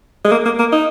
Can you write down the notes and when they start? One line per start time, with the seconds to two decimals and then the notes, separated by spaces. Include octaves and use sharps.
0.24 G#3
0.32 A#3
0.45 A#3
0.59 A#3
0.72 D#4